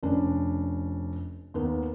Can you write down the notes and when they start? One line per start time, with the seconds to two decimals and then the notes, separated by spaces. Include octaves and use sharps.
0.03 F1 C#4 D4
1.54 D#2 A#3 B3